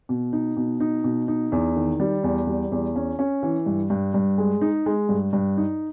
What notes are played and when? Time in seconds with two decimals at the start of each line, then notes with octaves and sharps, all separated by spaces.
0.09 B2
0.33 D#4
0.57 B2
0.80 D#4
1.04 B2
1.28 D#4
1.52 E2
1.76 D#3
2.00 G3
2.24 E2
2.47 G3
2.72 E2
2.96 C#4
3.19 C#4
3.43 E3
3.66 G2
3.90 G2
4.14 G2
4.38 G#3
4.61 D#4
4.86 G#3
5.09 G2
5.33 G2
5.57 D#4